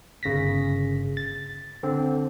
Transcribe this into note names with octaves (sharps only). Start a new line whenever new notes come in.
G1 C#3 A#6 B6
A6
D3 C4